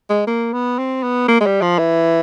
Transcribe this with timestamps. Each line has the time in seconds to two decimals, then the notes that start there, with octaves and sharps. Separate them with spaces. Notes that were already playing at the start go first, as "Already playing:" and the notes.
0.10 G#3
0.27 A#3
0.53 B3
0.78 C4
1.03 B3
1.28 A#3
1.41 G#3
1.46 G3
1.62 F3
1.79 E3